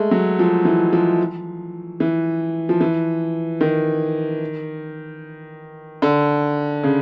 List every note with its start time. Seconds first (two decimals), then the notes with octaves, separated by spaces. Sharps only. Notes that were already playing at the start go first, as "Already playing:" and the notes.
Already playing: G#3 A3
0.11 F#3
0.39 F3
0.65 E3
0.93 F3
2.00 E3
2.69 F3
2.81 E3
3.61 D#3
6.02 D3
6.83 C#3